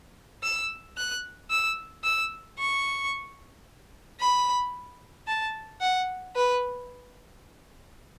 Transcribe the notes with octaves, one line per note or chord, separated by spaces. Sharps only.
E6
F#6
E6
E6
C#6
B5
A5
F#5
B4